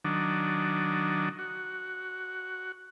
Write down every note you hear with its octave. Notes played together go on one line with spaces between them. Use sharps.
D#3 F#3 D4
F#4